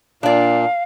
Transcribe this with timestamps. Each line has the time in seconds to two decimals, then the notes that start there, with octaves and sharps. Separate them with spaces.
0.23 A#2 D4 D5 F5